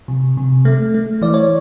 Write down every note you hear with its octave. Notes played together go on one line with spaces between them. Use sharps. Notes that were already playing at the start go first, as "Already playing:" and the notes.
C3
C3
A3
A3
E3 D5
C#5